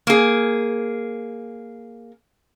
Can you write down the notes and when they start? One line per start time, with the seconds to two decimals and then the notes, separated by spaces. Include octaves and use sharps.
0.07 A#3 G#4